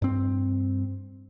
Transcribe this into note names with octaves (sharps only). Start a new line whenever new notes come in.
G2 C4